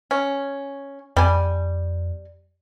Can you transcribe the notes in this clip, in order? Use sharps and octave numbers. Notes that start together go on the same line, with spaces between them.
C#4
F2 G3 G#5